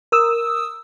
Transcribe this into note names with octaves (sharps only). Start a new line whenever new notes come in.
A#4 D#6 E6